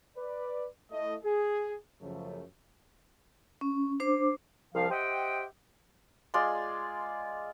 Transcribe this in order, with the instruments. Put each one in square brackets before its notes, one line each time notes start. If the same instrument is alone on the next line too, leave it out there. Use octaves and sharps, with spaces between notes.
[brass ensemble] B4 D5
A3 E4 D#5
G#4
F#2 C#3 F3 A3
[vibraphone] C#4
D4 C5 D6
[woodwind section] C2 F3 F5
G4 C5 D#5 E5 F#5 G5
[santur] G#3 F4 D5 C6